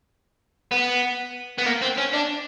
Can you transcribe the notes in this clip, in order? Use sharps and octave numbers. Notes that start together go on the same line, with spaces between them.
B3
B3
A#3
C4
C#4
D4